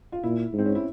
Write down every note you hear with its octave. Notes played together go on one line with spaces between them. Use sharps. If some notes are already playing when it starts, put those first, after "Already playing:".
F4
A#2 E4
G#2 C4
C#4
E4